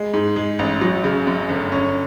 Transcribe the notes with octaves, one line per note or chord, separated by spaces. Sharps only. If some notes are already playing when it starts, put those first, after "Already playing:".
Already playing: G#3
G#2
G#3
A1
F#3
C#3
F#2
G1
C#4